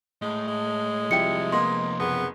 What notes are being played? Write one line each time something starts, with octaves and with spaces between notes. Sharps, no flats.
A2 G#3
G#3
F2 C3 F3 G3 E4 G5 C#7
A#3 B3 D#5 C6
F#1 B3 G#4